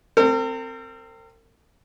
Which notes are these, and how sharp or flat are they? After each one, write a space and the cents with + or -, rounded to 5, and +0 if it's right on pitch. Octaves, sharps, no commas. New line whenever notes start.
C4 +0 A#4 -45